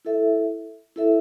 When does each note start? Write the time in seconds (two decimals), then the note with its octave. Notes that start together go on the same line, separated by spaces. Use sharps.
0.05 E4 A4 E5
0.96 E4 A4 E5